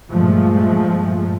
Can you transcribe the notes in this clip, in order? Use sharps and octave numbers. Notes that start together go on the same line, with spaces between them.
G2 A#2 F3 G#3 A3